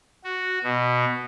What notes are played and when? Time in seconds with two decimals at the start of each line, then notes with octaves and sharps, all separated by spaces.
0.24 F#4
0.64 B2